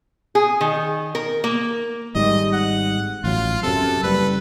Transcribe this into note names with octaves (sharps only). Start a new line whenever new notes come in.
G#4
D#3
A#4
A#3
G#1 G#2 G3 D#5
F#5
A1 F#3 F4
F#2 C3 A4
F#1 G3 B4